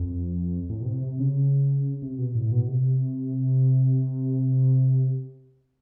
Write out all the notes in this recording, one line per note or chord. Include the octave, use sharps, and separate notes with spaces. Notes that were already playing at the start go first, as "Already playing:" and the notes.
Already playing: F2
A2
B2
C3
C3
C#3
C3
B2
A2
B2
C3